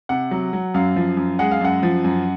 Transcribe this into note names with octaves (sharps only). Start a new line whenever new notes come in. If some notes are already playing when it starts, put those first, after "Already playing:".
C3 F#5
F#3
F#3
F#2 F5
F3
F#2
G#3 F#5
F5
F#2 F#5
F3
F#2